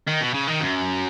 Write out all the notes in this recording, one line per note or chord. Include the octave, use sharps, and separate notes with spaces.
D#3
B2
C#3
D#3
F#2